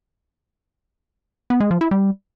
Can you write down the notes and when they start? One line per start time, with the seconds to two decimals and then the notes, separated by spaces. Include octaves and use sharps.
1.50 B3
1.60 G#3
1.71 F3
1.81 E4
1.91 G3